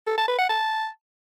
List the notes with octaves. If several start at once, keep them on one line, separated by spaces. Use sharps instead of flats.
A4
A5
B4
F#5
A5